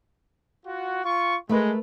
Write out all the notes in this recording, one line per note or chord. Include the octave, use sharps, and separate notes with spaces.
F4 F#4
F4 C#6
G#3 A3 A#4 B4